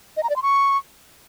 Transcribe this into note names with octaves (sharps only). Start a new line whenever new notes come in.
D#5
A#5
D5
C6
C#6